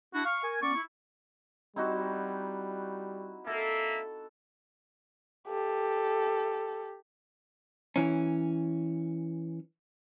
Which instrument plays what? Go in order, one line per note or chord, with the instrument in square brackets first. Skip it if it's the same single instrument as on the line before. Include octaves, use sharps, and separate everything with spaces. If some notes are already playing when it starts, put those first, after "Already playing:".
[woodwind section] D4 E4 [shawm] F#4
[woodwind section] F5 [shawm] C#6
[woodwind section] A#4 G#5
[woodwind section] B3 C#4 D5 [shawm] C#6
[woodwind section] E4
[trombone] G3 [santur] C4 D#4 F#4 [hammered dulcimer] E4
[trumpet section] A#3 E5 [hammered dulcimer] A4
[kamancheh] G4 A4
[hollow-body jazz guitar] E3 C#4